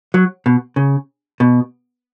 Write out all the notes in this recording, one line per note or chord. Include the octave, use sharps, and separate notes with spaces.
F#3
B2
C#3
B2